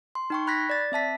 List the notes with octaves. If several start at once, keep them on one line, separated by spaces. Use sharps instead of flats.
C6
D#4 G5 C#6
B5 F#6 G#6 A#6 B6
D5 A6
C4 E5 A5 B6